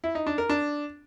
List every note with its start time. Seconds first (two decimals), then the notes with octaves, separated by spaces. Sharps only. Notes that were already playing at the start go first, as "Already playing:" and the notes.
0.04 E4
0.15 D#4
0.27 D4
0.38 A#4
0.49 D4